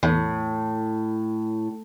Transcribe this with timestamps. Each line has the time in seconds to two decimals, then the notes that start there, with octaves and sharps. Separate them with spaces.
0.03 E2 A2